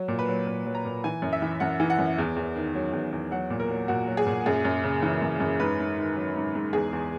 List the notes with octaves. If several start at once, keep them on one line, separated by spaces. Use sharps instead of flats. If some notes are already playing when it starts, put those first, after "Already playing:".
Already playing: F#3
A#2
B4
F#3
A#2
F#3
A#5
A#2
E3 G#5
F#2
E5
E3
F#2 F#5
E3
F#5
F#2
E2
E2
D#3
F#3
E2
E2
F#3 F#5
A#2
A#4
F#3
A#2 F#4
F#3
G#4
A#2
F#2 G#4
F#2
C#3
E3
F#2
F#2
G#2 B4
G#2
D#3
F#3
G#2
G#2
E2 G#4
E2